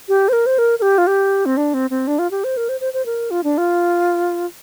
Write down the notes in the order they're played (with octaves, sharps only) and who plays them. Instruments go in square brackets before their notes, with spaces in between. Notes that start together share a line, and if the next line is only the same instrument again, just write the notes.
[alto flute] G4
C5
A#4
C5
A#4
A#4
G4
F4
G4
C4
D4
C4
C4
D4
F4
G4
C5
A#4
C5
C5
C5
A#4
F4
D4
F4